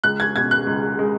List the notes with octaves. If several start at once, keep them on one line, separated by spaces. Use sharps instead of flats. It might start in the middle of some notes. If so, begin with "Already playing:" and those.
C#2 F#6
G#6
B2 G#6
F#6
C#2
G#3